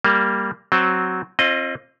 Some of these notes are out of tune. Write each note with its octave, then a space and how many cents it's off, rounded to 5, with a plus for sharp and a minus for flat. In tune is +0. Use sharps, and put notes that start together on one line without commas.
G3 +0 A#3 -10
F#3 +5 C4 +0
C4 +35 F4 -15 D#5 -10